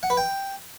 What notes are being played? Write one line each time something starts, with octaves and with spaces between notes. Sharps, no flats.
F#5
B4
G5